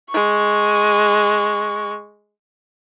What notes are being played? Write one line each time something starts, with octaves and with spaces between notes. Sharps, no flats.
G#3 C#6